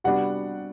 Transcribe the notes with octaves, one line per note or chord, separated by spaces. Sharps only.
C3 G3 B3 D4 F#4 F#5